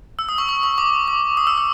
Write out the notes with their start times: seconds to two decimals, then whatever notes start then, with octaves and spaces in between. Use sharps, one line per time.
0.19 E6
0.29 D#6
0.38 C#6
0.49 C#6
0.63 C#6
0.78 D6
1.08 D6
1.37 D#6
1.47 E6
1.58 E6